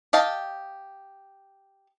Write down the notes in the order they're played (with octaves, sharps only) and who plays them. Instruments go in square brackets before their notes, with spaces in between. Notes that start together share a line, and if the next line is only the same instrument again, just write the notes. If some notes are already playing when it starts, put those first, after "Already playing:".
[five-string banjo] G4 D#5 F5 A5